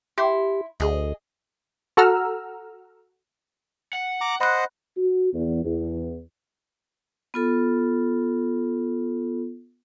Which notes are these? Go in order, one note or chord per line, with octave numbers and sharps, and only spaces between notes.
E4 G4 C6
D2 G#4 D#5
F#4 A4 F#5 A#5 E6 F6
F#5
A#5 D6
C5 D#5 F#5 B5 F#6
F#4
E2
E2
B3 F4 A4